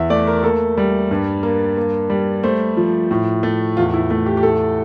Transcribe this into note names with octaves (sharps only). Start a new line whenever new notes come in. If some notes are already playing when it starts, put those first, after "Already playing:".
Already playing: E2 E5
A3 D5
A#4
A#3 A4
G3
G2
A#3
A#3
G3
A3 C5
F3
A2
A3
E2 F4
E4
A3
G4
G4
A2 A4